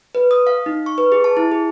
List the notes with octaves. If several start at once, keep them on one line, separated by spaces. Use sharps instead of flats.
B4
D#6
F5
D#4
C#6
B4
G#4
A5
E4
G#4